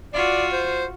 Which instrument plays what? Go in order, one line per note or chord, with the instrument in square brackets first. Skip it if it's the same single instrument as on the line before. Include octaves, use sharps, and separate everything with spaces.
[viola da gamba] F4 F#4 [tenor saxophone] D5
[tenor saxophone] C5